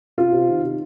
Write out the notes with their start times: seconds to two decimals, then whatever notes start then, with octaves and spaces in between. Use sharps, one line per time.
0.18 C3 F4
0.33 C3
0.48 D#3
0.63 C3